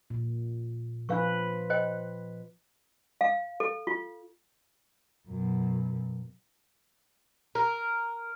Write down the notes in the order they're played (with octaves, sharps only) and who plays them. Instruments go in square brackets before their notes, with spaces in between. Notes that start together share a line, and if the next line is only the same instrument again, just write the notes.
[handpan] A#2
[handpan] F3 B4 [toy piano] D4 F5 C#6
[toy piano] C5 D#5 G5
F5
A4
F4
[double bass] F#2 B2
[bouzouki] A#4